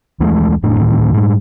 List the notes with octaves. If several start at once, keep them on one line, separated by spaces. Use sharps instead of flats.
D#2 E3 G#3 A3
F1 A2 A3 D4
D2 A2 D#3
G#2 G3